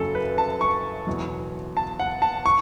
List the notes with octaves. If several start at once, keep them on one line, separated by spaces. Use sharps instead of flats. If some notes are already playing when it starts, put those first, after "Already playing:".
Already playing: F#1 F#2 F#3 C#4 A4
B4
A5
C#6
E2 B2 F#3
A5
F#5
A5
C#6